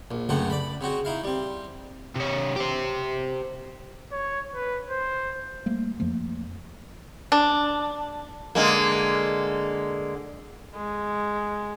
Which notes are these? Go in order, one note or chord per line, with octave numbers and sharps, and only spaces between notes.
A#1
C#2 F#2 C#3 A3 C4 F#5
D5 B5
C#3 C4 F#4
D#4 E4 F5
G3 C4
C3 C#5
G4 C5
C#5
B4
C5
G3 A3 A#3
F2 F3 A3 A#3
D4
D3 G#3 A#3
G#3